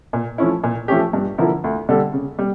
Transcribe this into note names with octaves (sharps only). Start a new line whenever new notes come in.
A#2
F3 A3 C#4 E4
A#2
F3 A3 C#4 G4
G2
D3 F3 A#3 E4
D2
D3 G3 D4 A4
C#3
G3